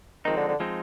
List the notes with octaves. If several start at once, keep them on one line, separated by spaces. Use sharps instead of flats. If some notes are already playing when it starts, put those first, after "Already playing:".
D#3 F3 G#3 C4 D#4
D3
D3
F3 G#3 C4 D#4